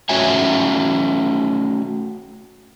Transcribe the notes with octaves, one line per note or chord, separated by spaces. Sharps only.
A3 C#4 F#4 C#5 E5 G#5